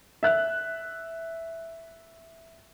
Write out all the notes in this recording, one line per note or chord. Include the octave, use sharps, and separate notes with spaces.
E5 F#6